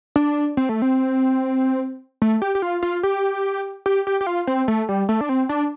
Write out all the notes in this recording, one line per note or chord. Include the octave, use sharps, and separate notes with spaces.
D4
C4
A3
C4
A3
G4
G4
F4
F4
G4
G4
G4
G4
F4
C4
A3
G3
A3
D4
C4
D4